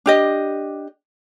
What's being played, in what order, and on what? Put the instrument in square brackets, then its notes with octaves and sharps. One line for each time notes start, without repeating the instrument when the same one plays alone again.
[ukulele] D4 G4 D#5